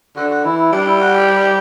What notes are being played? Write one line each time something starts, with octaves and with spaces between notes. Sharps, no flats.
D3 F#4
F#4
E3 E4
E4
G3 D4
E4
F#4
G4